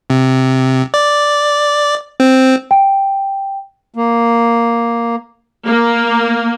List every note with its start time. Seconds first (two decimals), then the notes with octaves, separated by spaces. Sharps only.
0.10 C3
0.94 D5
2.20 C4
2.71 G5
3.94 A#3
5.67 A#3